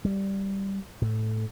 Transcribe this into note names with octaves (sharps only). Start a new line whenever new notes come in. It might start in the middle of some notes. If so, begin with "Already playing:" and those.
G3
A2